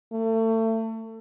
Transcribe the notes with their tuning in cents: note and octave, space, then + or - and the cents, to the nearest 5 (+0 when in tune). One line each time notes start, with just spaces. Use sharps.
A3 +30